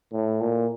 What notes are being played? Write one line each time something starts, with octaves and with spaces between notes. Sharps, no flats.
A2
A#2